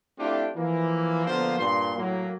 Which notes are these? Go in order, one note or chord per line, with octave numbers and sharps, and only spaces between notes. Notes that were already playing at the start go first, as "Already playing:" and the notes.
A3 C4 D4 E4 F4 G4
E3 F3 A#3
D3 F3 A#3 B3 F4 C5
G2 A#2 C6
A2 F#3 A#3